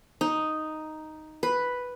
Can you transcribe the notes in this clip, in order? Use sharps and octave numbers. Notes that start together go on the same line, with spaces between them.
D#4
B4